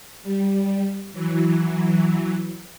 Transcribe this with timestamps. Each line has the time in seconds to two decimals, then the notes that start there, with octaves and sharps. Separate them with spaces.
0.23 G3
1.13 E3 F#3